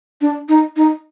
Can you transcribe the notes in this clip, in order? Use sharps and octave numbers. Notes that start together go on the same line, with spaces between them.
D4
D#4
D#4